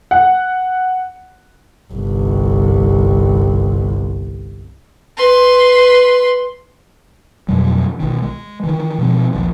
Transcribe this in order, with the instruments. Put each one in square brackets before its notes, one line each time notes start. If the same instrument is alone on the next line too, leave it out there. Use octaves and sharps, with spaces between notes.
[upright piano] F#5
[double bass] G1 C2
[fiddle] B4 C6
[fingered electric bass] F2 B2 F#3 G3
B1 D#3
G#3
D#3 E3
B2 F3 G#3 C4
A#1 D#2 F3